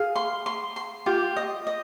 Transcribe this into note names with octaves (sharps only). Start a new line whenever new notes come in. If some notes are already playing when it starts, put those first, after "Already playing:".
Already playing: G#4 F5
C6
C6
C6
F4 G4
D#5
D#5